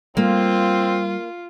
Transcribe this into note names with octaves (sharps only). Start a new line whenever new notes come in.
G3 A#3 C4 F4